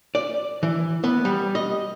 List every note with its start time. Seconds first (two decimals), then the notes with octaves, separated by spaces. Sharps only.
0.15 D5
0.63 E3
1.04 B3
1.25 G3
1.55 D#5